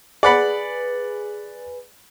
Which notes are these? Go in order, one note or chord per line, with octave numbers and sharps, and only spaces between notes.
G#4 B4 D5 F#5 B5